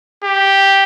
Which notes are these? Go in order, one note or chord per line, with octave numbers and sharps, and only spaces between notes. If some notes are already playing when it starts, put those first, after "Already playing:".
G4